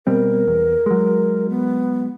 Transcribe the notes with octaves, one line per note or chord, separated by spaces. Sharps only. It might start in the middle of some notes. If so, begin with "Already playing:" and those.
B2 G3 C4 A#4
E2
F#3 G#3
B3